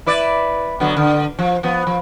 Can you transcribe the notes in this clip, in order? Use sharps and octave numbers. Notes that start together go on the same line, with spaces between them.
E4 B4 D5
D3 F#3 B3
D3
F3
F3 B3
F3